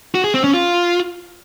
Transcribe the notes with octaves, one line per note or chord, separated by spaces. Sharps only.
F#4
G#4
C4
C#4
F4